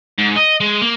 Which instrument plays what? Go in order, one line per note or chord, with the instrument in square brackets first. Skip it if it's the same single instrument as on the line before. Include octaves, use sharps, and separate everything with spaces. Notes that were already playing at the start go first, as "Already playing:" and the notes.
[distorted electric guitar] G#2
D#5
G#3
A#3